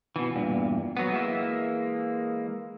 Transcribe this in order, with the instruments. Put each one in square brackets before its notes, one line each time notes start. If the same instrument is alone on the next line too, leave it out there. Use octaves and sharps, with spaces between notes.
[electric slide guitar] B2 E3
E2 G2 A#2
F#3 B3
E3 G#3 A#3 E5